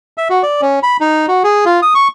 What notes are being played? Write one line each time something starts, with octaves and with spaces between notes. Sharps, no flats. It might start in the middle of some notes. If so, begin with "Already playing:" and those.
E5
F#4
D5
C#4
B5
D#4
F#4
G#4
F4
D#6
C#6